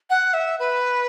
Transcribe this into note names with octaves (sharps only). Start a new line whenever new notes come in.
F#5
E5
B4